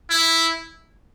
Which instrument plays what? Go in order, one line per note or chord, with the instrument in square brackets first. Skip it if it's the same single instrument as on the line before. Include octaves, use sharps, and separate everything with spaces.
[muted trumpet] E4